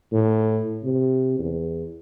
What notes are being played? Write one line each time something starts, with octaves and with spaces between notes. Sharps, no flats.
A2
C3
E2